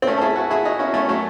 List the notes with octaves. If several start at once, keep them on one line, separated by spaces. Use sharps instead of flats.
C4
A3 C#4
A4
E4 G#4
F#4 A4
E4 G#4
D#4 F#4
C#4 E4
A3 C#4
F#3 A3